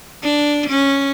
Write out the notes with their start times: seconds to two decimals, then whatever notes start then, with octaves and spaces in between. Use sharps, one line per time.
0.23 D4
0.70 C#4